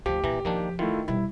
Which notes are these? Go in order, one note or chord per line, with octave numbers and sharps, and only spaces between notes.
D2 F3 G4
A#2 E3 A#5
D#3 F3 A#3 D4
D#3 A3 E4 F4
B2 G3 E4